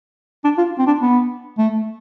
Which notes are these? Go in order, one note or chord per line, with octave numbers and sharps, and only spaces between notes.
D4
F4
C4
D4
B3
A3